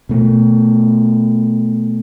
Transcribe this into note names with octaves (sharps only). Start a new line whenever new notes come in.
B2 A3